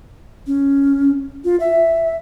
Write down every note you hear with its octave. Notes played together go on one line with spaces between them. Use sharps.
C#4
F4
E5